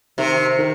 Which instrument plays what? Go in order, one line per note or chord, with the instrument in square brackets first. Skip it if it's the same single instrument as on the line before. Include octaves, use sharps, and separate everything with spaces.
[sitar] C3 [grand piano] D#3
[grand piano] D#3